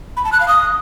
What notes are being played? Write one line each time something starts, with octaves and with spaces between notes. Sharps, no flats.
B5
A5
F#6
F5
D#6